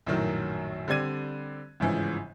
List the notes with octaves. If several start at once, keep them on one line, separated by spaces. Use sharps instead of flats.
A#1 F#2 A2 D#3 F#3
D3 G3 C4 D5 G#6 D#7
G1 G#2 C#3 E3 F3